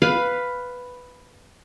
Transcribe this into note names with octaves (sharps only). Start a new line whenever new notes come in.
B4 F5 B5